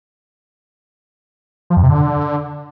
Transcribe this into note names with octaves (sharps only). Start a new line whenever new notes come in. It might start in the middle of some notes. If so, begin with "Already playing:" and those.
F3
F2
C3
D3